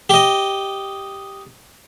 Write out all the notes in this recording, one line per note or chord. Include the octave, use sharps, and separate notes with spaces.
G4 D#5